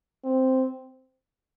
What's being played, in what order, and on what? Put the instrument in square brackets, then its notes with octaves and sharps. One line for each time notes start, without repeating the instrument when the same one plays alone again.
[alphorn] C4